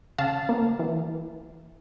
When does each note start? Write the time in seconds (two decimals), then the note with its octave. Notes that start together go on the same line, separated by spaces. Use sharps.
0.18 C#3 F5 A5
0.49 A#3
0.79 E3